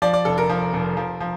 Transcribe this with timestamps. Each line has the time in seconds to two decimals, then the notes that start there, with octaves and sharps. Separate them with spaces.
0.02 F3 D5
0.13 D5
0.25 F1 A4
0.38 A#4
0.49 F3
0.73 F1
0.97 F3
1.20 F3